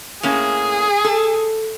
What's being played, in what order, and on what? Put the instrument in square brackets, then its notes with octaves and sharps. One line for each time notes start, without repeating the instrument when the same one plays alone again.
[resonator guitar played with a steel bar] A2 A#3 C#4 [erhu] G#4
[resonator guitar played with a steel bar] A4